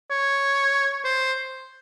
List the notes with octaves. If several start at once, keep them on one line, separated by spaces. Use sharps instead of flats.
C#5
C5